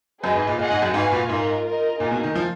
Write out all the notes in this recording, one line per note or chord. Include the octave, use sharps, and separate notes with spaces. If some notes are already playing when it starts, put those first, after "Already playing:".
F#2 G#4 B4 D#5
G#2
A#2
A#2 G#4 D#5 F#5
G#2
F#2
G#2 F#4 B4 F5 G#5
A#2
G#2 F4 A#4 D#5
F4 A#4 D#5
A#2 A#3 D#4 G#4 D#5
B2
D#3
F3